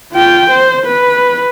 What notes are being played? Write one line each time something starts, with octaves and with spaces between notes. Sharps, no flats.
F4 G5
C5
B4